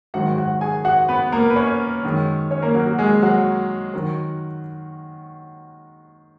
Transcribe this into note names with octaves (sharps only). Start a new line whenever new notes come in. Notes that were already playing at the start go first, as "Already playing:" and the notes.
G#2 D#3 F#3 F#4 F#5
F#4 F#5
G#4 G#5
F#4 F#5
B3 B4
A#3 A#4
B4
C#4 C#5
F#2 D#3 G#3
C#4 C#5
A#3 A#4
F#3 F#4
F#3 F#4
G#3 G#4
F#3 F#4
D#3 F#3